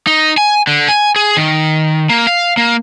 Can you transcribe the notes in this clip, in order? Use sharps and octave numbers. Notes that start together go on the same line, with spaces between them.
D#4
G#5
D3
G#5
G#4
D#3
A#3
F5
A#3